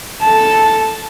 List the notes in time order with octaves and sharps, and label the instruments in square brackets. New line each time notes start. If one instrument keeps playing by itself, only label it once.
[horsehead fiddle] A4 A5